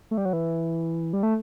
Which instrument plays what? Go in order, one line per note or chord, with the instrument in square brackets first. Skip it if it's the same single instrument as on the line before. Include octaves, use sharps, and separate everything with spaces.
[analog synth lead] A3
G3
F#3
E3
G3
A3